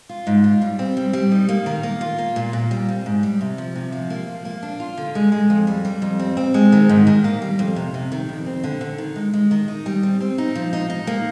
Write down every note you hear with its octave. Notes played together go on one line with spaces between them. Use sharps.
F4
G#2
F4
G3
C4
G3
G3
D#4
A#3
D#3
A#3
F4
A#3
A#2
A#2
G3
C4
G#2
G3
C3
F3
C3
F3
A#3
F3
A#3
D4
F4
D3
G#3
G#3
F2
G3
G3
F2
C4
C4
G#3
D#3
G#2
D#3
A#3
G3
F2
C3
C3
D#3
F2
C4
D3
D3
D#3
G#3
G#3
D#3
D#4
G3
C4
C4
D#4
F3
D#4
D#4
A#3